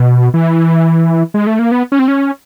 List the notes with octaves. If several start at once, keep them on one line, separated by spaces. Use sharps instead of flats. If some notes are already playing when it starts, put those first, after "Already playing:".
Already playing: B2
E3
G#3
A3
A#3
B3
C#4
C4
C#4